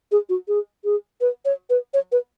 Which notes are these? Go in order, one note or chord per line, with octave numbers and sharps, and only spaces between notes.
G#4
F#4
G#4
G#4
B4
C#5
B4
C#5
B4